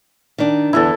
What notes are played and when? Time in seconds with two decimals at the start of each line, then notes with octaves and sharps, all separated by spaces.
0.38 D#3 D4
0.73 E2 D3 E4 A4